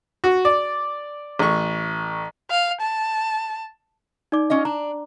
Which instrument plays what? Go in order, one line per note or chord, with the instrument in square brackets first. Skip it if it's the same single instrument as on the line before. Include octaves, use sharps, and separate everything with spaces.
[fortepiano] F#4
D5
A1 C#6
[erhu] F5
A5
[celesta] D#4 D5 D6
[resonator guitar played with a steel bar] C#4 F4 D#5
[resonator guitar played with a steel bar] D4 [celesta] A#5